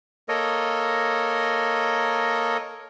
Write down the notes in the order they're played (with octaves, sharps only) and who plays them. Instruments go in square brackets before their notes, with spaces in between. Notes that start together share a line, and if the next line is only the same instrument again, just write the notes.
[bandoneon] A#3 A4 A#4 C#5 D#5